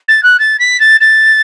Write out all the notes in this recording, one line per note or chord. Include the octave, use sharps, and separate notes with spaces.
A6
F#6
A6
B6
A6
A6